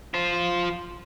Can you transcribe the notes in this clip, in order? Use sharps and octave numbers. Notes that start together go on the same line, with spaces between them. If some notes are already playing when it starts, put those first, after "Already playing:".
F4 C5